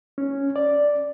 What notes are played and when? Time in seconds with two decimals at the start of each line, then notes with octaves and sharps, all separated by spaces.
0.18 C#4
0.56 D5